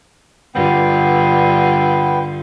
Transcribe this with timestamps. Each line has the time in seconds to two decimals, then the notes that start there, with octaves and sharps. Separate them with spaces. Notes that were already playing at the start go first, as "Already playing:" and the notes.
0.55 G2 D3 B3 F4 G5